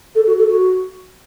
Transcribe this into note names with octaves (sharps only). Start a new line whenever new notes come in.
A4
F#4
A4
F#4